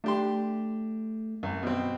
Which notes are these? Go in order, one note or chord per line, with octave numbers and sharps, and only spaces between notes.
A3 D4 G4 C6
C2 F#2
B2 C4